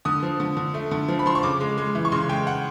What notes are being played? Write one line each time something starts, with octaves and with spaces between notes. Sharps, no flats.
D3 D#6
F3
D3
D3
A3
D3
F3
B5
F3 C6
C#6
C#3 D6
G#3
G#3
E3
C#6
C#3 C6
G#3 G5
F#5